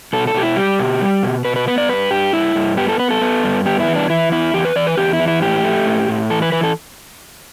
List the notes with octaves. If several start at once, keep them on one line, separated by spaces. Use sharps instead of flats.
B2 A4
A4
B2 G4
E4
G3 G4
B2
G3
B2
B2 B4
B4
B3 B4
D5
G2 B4
G2 G4
G2 E4
G2
B3 G4
A4
B3 B4
A4
B3
G2
B3 G4
E4
E3
D4
E3 E4
E2 E4
E2 G4
B4
E3 D5
B4
E2 G4
E4
E3
E4
A2 G4
A3
A2
A2
E3 A4
B4
E3 B4
A4